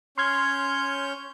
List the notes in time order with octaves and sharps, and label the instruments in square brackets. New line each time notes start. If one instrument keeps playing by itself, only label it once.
[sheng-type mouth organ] C#4 C#5 G6 [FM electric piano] C6 F6 G#6